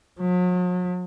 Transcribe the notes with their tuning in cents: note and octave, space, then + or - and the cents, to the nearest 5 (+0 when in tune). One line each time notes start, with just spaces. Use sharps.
F#3 -45